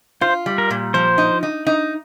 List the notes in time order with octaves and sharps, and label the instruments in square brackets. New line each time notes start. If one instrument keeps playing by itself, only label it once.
[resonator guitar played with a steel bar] F4 [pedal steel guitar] C5
[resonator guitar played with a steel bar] G3
[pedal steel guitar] A#4
[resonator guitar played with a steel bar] A#2
[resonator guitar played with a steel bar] F3 [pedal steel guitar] C5
[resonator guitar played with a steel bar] D#4
D#4
D#4